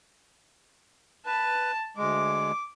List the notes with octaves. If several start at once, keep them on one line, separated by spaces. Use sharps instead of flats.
B4 A5
D2 G#3 D6